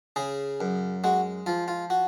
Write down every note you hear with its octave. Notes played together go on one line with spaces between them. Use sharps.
C#3 G#4
F#2
G#3 F#4
F3 F4
F4
F#4